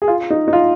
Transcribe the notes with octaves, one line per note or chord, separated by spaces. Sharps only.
G#4
F4
D#4
D#4
F4